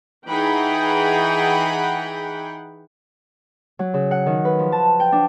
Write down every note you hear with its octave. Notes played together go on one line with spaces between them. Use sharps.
E3 D#4 G#4 F#5 G5 B5
F#3
C#3
F#5
D#3
B4
F3
A5
G5
D4